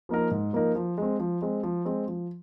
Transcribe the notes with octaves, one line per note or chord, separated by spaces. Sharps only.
F3 A#3 D#4 A#4
G#2
F3 A#3 D#4 A#4
F3
G#3 C4
F3
G#3 C4
F3
G#3 C4
F3